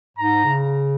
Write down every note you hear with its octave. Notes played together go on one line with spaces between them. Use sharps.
G#2 A#5
C#3